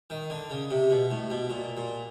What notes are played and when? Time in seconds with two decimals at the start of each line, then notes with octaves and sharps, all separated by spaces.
0.10 D#3
0.30 D3
0.50 C#3
0.71 C3
0.90 B2
1.11 A2
1.30 B2
1.50 A#2
1.77 A#2